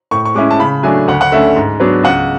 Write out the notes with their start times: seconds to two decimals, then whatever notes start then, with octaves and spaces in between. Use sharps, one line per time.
0.11 A2 C#6
0.25 C#6
0.35 G#3 C#4 E4 D6
0.51 A5
0.59 C#3 B5
0.83 F#3 A3 D4 G#5
1.08 D2 F#5
1.21 F#5
1.32 D3 A3 C#4 E5
1.56 G#2
1.80 F#3 B3 D4
2.03 C#2 F#5